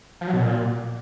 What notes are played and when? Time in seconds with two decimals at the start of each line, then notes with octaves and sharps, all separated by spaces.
0.21 F3
0.27 F#3
0.33 B2
0.40 A#2